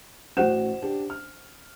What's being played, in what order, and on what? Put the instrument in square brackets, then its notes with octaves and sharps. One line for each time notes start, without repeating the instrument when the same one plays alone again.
[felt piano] A1 F#4 E7 [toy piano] C#4 C5 F#5
[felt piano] D4 G4
F6